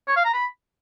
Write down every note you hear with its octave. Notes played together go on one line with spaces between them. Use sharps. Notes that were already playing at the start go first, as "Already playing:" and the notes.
C#5
F5
A#5
B5